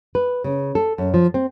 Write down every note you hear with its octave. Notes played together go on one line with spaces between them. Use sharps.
B4
C#3
A4
F#2
F3
C4